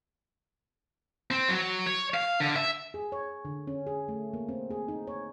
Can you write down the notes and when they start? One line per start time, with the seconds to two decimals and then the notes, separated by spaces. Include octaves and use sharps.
1.31 C4
1.49 F#3
1.86 C#5
2.14 F5
2.40 D3
2.56 E5
2.94 G#4
3.12 C#5
3.45 D3
3.67 C#4
3.87 G#4
4.08 A3
4.34 A#3
4.49 C4
4.71 G#4
4.88 D#4
5.07 C#5